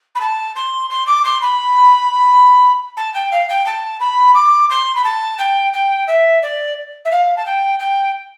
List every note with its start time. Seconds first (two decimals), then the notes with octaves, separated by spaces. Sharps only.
0.15 B5
0.20 A5
0.55 C6
0.90 C6
1.06 D6
1.24 C6
1.41 B5
2.96 A5
3.14 G5
3.31 F5
3.48 G5
3.66 A5
4.00 B5
4.34 D6
4.69 C6
4.95 B5
5.04 A5
5.38 G5
5.73 G5
6.07 E5
6.42 D5
7.05 E5
7.11 F5
7.36 A5
7.45 G5
7.79 G5